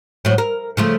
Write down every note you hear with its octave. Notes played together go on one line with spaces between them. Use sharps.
A2 F#3
A#4
C#3 F3 A3